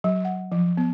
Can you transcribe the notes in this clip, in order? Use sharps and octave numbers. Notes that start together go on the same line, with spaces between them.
F#3
F#5
F3
B3